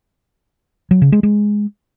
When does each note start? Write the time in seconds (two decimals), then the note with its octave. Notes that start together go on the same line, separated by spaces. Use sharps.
0.91 F#3
1.02 C#3
1.12 G#3
1.23 G#3